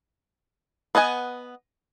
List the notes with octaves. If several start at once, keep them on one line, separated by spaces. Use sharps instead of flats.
B3 D#5 F#5 G#5